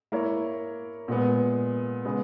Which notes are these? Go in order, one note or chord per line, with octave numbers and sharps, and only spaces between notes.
A#3 E4 A#4 C#5
A#2 G#3 B3
C#3 G#3 B3